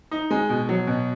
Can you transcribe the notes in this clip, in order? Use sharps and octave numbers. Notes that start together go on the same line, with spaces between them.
D#4
G#3
B2
F#3
B2